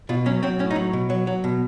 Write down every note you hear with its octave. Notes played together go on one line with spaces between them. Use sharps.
B2 F4
F#3 C#4
F#3 C4
A2 C#4
D#4
F#3
B2
F#3
F#3
B2